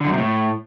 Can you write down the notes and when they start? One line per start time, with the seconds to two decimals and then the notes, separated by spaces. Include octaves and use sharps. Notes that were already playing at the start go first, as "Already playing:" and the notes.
0.01 D3
0.06 F#2
0.12 C3
0.18 A2